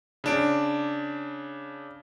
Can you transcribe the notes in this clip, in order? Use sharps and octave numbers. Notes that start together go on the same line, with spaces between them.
C#3 D4 D7